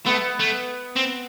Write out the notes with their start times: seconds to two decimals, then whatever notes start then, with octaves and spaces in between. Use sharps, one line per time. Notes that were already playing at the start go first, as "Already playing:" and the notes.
0.06 A3 B3
0.40 A3
0.96 C4